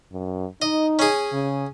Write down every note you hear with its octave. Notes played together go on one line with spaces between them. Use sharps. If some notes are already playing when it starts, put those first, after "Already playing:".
F#2
D#4 D#5
C#4 G#4
C#3